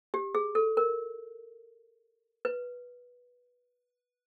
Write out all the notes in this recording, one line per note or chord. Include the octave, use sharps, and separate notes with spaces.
G4
G#4
A4
A#4
B4